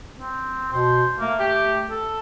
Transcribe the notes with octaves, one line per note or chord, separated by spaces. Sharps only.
C4
B2 C5
A3 A#3
G4
A4